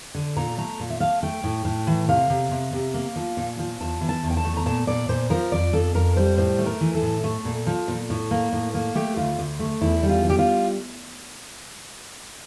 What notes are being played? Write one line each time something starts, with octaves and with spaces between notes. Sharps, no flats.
D3
A#2 A#5
A3 A#5
A#2
E5
A3 F5
A3 G5
A2
A2
E3
C3 F5
C3
C3
C3
A#3
F3
A#2
F3
E2 A5
E3
A5
E2
G5
A5
A3
A#5
A#2 A5
A#2 D5
A#2 C5
F3 A#4
F2 D5
F2 A4
F2 A#4
G3 C5
A2 C5
A3
A#4
E3
A4
A2
A3
A#2
F3
A#2
A2
A#3
A2
A#3
A3 G4
D2 F4
D2
A3
E2 E4
G3
F4
G3 G4
F4